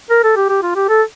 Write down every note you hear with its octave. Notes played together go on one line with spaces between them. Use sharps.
A#4
A4
G4
G4
F4
G4
A4